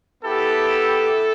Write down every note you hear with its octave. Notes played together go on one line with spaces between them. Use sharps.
B3 E4 G4 A4